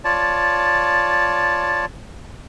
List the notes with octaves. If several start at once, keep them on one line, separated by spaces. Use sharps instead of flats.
F4 C#5 D5 A5